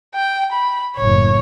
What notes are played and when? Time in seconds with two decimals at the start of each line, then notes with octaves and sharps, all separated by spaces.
0.15 G5
0.52 B5
0.97 F#1 A2 C#5